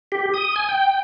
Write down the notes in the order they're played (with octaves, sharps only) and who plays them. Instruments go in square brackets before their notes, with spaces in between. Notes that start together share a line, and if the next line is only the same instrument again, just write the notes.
[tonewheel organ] G4
D#6
G#5
G5